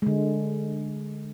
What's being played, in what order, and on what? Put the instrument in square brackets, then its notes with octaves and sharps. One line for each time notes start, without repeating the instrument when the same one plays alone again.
[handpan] D3 G#3